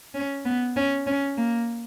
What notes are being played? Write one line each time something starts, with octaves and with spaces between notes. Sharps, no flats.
C#4
B3
C#4
C#4
A#3